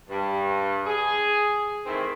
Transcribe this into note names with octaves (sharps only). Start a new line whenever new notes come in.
G2
G#4
D#3 E3 A3 C4 E4